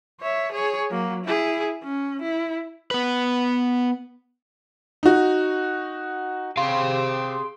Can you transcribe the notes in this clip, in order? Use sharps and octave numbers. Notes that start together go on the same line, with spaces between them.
C#5 E5
G#4 C#5
F#3 A#3
E4 G#4
C#4
E4
B3 B4
D#4 F#4
C4 G4 G#4 F5 C6